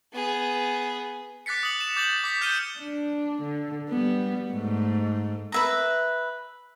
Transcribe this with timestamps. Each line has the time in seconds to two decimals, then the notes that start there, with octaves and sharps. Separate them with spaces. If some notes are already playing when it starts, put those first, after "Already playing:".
0.12 B3 G#4
1.46 D6 F#6 A6 B6 C#7
1.63 D#6 F#7
1.81 E7
1.96 D6 G6 A6 E7 F#7
2.24 D6 B6
2.41 F6 G6 C#7 D#7 G7
2.79 D4
3.42 D3
3.89 G3 B3
4.52 G#2 A3
5.52 B4 E5 A#5